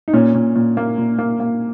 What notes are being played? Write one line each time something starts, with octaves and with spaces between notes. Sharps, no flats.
D#4
A#2 C#4
A#2
A#2
A#3
A#2
A#3
A#3